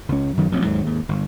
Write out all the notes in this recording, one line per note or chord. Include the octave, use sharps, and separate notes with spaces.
C#2 C#4
F#2 D#3 F#3
A1 F3 F#3 C4
D#2 G#2 F#3
D#2 G#2
G1